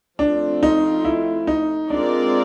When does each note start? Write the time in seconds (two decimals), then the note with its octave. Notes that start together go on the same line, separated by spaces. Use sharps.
0.19 F3 A3 C4 D4 F4
0.63 D#4
1.05 E4
1.47 D#4
1.90 G#3 C4 D4 F4 A#4 D5